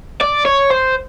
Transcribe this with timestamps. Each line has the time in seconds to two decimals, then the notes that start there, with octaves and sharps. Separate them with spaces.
0.21 D5
0.45 C#5
0.70 C5